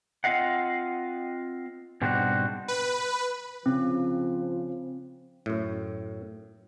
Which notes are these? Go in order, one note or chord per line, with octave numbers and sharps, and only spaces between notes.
C4 F4 D#5 F5 F#5
G#2 B2 G3 C4 D4 F#4
B4
C#3 F3 C4
F#2 A2